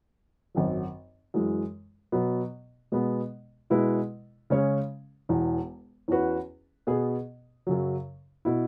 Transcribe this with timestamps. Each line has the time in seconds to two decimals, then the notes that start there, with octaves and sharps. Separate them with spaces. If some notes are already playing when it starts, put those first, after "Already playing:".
0.55 G#1 F#2 F#3
1.34 F#2 E3 G#3
2.12 B2 F#3 B3
2.92 B2 G#3 B3
3.70 B2 G#3 E4 B4
4.50 C#3 G#3 C#4 G#4 C#5
5.29 E1 E2 E3
6.08 E2 E3 C#4 F#4 B4
6.87 B2 B3 G#4
7.67 F#2 C#3 F#3
8.45 B2 B3 E4